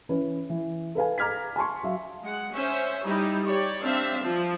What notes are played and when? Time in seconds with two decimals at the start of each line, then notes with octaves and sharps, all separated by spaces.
0.09 E3 C#4 B4
0.50 E3
0.95 A4 B4 F5 G#5
1.18 A#5 D6 F6 G#6 B6
1.56 G#5 A5 C6 C#6
1.83 F#3 E5 F5
2.23 G#3 F#5
2.53 C#4 C5 E5
3.05 G3 D#4 E4 G4
3.44 G4 C#5 D5
3.83 C4 D4 E5 F5
4.22 F3